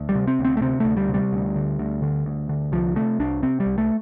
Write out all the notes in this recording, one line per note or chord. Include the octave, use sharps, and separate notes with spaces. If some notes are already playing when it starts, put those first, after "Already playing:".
Already playing: D2
G3
C3
C4
D2
C4
A3
C3 C4
D2 A3
G3
C3
G3
D2
D3
D2
D3
D2
D3
C2 F3
C3 A3
C2 D4
C3 C4
G3
C2
A3